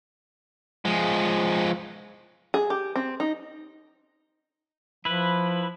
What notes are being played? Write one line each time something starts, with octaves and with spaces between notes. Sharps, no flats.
F3 G#3
G#4
G4
C4
D#4
F3 E4 B4